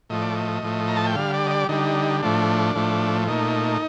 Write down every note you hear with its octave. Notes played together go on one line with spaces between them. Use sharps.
A2 F3 A3 D#5
D5
D#5
A2 F3 A3
A#5
A5
G5
D3 G3 F5
D5
D#5
D5
D3 G3 D#4
A2 F3 A3 D4
A2 F3 A3
A#2 A3 D#4